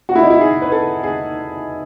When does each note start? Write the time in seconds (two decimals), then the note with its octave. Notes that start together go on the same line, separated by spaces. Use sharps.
0.09 F#4
0.15 E4
0.23 D#4
0.30 E4
0.41 G#4
0.62 B4
0.72 A4
1.03 G#4